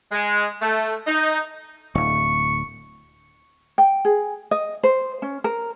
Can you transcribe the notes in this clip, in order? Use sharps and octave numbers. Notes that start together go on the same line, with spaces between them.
G#3
A3
D#4
D1 C#6
G5
G#4
D#5
C5
C#4
A#4